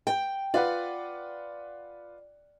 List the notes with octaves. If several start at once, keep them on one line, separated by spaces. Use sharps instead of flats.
G5
F4 B4 D5 F#5